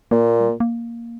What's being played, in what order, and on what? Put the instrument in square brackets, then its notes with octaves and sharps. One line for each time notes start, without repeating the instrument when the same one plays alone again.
[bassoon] A#2 [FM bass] A#3
[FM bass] G3
A#3
A#3